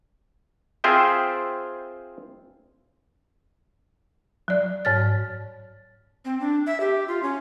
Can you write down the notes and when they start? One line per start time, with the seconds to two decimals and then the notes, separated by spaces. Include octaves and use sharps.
0.84 C4 F4 G#4 C5 E5 G5
4.48 F#3 D5
4.85 G#2 C#5 F6 A6
6.25 C4
6.40 D4
6.67 E5
6.80 G4
7.08 F4
7.23 C#4